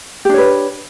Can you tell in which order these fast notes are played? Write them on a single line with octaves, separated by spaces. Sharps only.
G4 D4 C#5 B4